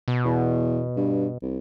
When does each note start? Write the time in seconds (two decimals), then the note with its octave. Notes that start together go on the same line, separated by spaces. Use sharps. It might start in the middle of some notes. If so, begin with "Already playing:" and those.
0.08 B2
0.25 E2
0.97 G2
1.42 C2